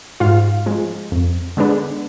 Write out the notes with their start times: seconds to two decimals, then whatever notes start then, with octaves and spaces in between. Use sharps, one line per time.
0.20 G#2 F4 F5
0.66 F3 G#3
1.12 F2
1.57 D3 G#3 B3 D4